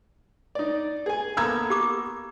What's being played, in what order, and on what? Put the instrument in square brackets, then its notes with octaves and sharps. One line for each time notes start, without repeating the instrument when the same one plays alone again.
[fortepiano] D#4 D5
G#4 G#5
[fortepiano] A#3 B3 A4 [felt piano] A#5 E6 G#6
[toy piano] G4 D6